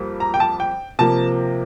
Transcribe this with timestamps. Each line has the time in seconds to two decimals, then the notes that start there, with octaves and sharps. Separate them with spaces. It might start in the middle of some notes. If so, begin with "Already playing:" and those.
Already playing: F2 G3 A#3
0.20 A#5
0.34 G5
0.40 A5
0.60 G5
0.99 C3 F3 A#3 A5